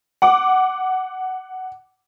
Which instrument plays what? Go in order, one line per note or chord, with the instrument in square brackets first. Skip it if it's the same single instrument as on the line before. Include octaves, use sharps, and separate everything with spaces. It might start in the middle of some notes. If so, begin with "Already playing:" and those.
[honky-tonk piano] F#5 D6